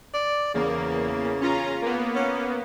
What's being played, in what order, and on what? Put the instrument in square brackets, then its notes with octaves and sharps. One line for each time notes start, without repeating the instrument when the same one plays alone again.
[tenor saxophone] D5
[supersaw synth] E2 A#3 [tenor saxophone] C#3
[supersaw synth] C#4 F4 A#5
A#3 B3
[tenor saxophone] C#4